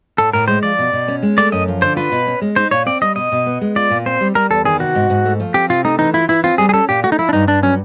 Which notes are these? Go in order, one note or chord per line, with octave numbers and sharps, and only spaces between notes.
A2 A4
A2 A#4
G#3 C5
F3 D5
B2
B2
C#4
G#3
A3 D5
F#2 D#5
F3
D3 C5
F4 B4
B2
C#4
G#3
D#4 C5
A#2 C#5
C4 D5
G3 D#5
B2 D#5
B2
B3
G#3
F4 D5
A#2
C4 C5
G3
G3 A#4
E2 A4
D#3 G#4
C3 F#4
G#2
G#2
A3
F3
C4 G4
C3 F4
A3 D#4
E3 D#4
E4 F4
E3 E4
C4 F4
G3 G#4
G#4
C#4 A4
A#2 G4
A3 F#4
D#4
F3 E4
D4
G2 D#4
G2 D4
F#3 C#4